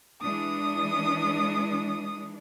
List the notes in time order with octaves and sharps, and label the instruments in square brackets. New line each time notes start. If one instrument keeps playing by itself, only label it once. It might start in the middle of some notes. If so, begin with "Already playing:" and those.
[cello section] E3 G#3 D4 [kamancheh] D#6